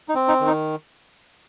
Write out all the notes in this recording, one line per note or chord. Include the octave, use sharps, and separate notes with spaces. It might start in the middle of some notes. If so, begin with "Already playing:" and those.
D#4
C4
D#4
D#3
D#4